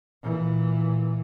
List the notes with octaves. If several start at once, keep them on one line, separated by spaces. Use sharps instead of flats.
A#2 E3